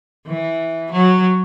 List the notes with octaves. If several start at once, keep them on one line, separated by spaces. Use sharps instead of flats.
E3
F#3